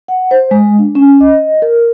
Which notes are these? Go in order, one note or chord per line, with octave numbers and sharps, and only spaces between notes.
F#5
C5
G#3
D4
C#4
D#5
A#4